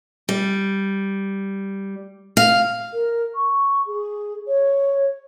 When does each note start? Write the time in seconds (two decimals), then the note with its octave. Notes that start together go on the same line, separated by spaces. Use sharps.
0.29 G3
2.37 F5
2.93 A#4
3.35 C#6
3.86 G#4
4.47 C#5